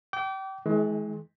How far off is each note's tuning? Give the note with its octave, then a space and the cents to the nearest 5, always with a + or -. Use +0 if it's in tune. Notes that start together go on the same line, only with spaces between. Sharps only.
G5 -30 D6 -30
E3 -35 G#3 +30